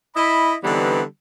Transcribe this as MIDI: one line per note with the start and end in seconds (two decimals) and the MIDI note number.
0.16 0.55 64
0.16 0.55 75
0.16 0.55 83
0.63 1.03 50
0.63 1.03 52
0.63 1.03 55
0.63 1.03 59
0.63 1.03 60
0.63 1.03 63